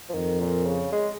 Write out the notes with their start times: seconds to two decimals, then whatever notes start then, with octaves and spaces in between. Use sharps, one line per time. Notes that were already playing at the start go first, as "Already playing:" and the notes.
0.09 F3
0.14 F2 D#3
0.39 A#2
0.65 C#3
0.92 G#3